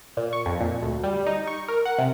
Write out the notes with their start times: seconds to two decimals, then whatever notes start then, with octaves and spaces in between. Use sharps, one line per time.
0.17 A#2
0.33 C#6
0.46 F2
0.60 A#2
0.82 D2
1.04 G3
1.27 D#4
1.48 C#6
1.68 A#4
1.85 F#5
1.98 C3